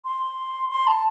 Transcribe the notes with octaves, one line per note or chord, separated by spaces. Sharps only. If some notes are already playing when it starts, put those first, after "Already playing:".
C6
C6
A5